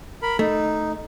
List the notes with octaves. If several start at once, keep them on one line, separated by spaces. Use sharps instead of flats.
A#4 B5
A3 D#4